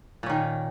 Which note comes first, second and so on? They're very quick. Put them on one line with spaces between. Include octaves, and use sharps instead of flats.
A#2 C#4 D#3